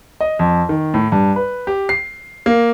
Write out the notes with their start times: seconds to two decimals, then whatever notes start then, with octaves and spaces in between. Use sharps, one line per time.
0.21 D#5
0.39 F2
0.69 D#3
0.94 A2
1.12 G2
1.36 B4
1.67 G4
1.89 C7
2.46 A#3